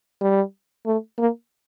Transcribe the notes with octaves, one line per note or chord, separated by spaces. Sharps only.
G3
A3
A#3